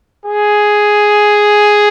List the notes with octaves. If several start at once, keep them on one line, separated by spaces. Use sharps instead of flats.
G#4